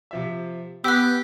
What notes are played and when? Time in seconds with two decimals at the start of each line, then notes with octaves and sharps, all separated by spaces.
0.11 C3 F3 E5
0.84 B3 G4 E6 F#6 B6